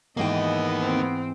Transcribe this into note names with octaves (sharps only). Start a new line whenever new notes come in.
G#2 E3 A#3 B3 D#4 D#5 G5
C4